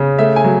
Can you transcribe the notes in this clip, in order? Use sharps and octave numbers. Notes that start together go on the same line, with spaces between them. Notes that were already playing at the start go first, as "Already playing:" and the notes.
Already playing: C#3
A3 E5
G#5
F#3